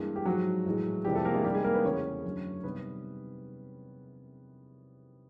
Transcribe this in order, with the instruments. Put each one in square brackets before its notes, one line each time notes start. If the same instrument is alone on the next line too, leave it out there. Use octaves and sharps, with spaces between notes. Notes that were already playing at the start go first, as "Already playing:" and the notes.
Already playing: [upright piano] G2 E3 G#3 A#3
G4
G#2 F3 F#3 G#3 F#4
A2 E3 G#3
F2 C3 E3 G3 G#3 G4
A3 A4
A#3 A#4
G#3 G#4
C3 D#3 G3 G#3 G4
G#3 G#4
A#3 A#4
B3 B4
E2 C#3 E3 A3 C#4 C#5
F#2 D3 F#3 A3
C3 D#3 G3 B3 B4